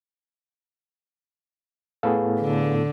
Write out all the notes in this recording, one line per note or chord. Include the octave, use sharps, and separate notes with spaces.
A2 B3 G#4 A4 B4 F5
D3